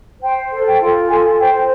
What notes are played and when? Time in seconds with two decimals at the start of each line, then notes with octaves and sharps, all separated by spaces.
0.21 C5 G5
0.51 A4
0.66 G5
0.80 F4
1.09 A4 G#5
1.39 C5 G5